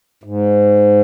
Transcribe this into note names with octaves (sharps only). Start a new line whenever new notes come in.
G#2